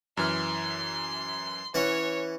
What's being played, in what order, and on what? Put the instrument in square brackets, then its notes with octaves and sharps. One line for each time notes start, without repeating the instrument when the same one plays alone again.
[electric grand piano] F#2 E3 F6 [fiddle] C6
[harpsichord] E3 C#4 F#5 [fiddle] C#5